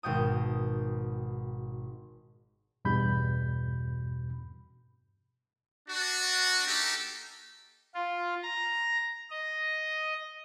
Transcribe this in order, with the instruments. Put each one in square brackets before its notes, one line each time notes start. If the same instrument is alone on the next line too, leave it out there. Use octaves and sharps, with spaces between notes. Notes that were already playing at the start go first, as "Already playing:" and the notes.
[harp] G#1 B2 G5 D#6
[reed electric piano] E2 G2 B2 B5 G6
[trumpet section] D4 F#4
A#3 D#4 G4 A4
[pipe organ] F4
A#5
D#5